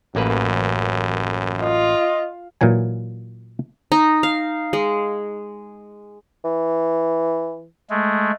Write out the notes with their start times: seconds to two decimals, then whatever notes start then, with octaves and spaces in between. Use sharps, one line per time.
0.15 A1 F#2 A#3 B4
1.61 F4 D#5
2.61 A#2 E3 F#3 G#5
3.92 D#4
4.23 F5
4.73 G#3
6.45 E3
7.90 G#3 A3